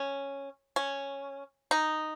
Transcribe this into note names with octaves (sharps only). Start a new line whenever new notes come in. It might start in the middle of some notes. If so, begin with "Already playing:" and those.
Already playing: C#4
C#4
D#4